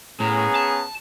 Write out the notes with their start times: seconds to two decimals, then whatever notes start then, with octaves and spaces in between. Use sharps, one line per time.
0.20 A2 B3 C#4 G#4 A#5
0.55 A5